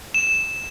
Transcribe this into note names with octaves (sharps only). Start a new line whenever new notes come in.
E7